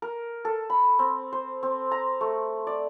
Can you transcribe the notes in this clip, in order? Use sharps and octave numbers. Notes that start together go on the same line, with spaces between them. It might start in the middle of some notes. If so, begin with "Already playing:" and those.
A#4
A4
B5
C4
C5
C4
A#5
A3
D5